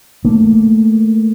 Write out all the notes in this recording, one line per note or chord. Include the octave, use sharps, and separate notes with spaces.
A3 A#3